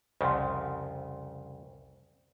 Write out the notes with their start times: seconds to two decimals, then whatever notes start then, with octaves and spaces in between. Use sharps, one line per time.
0.21 C2 F2 C#3 C5 F#5 C6